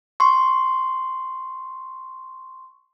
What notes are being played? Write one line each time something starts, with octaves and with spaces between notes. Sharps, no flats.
C6 C#6